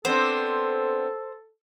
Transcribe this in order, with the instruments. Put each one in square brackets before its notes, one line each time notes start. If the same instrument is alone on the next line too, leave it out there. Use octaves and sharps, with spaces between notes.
[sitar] B3 C4 D4 [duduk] A4 [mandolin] C5